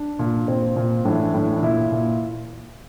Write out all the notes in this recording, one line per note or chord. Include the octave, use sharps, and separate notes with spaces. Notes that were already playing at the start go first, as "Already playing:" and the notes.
Already playing: D4
A#2
A#2 C4
A#2
A2 E3 D4
A2 E3
D4
A#2 E4
A#2